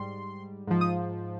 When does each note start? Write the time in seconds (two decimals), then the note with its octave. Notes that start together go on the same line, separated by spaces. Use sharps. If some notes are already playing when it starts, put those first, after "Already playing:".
Already playing: G#2 G3 C6
0.67 G#2 F3
0.81 D#6